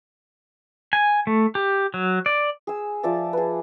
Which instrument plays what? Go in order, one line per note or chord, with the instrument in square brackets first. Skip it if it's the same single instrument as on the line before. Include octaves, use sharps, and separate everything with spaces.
[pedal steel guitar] G#5
A3
G4
F#3
D5
[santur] G#4 E6
F3 D5 E5 A5
G#4 B4